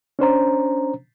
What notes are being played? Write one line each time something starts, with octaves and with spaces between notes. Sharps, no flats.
C#4 D4 C5 A#5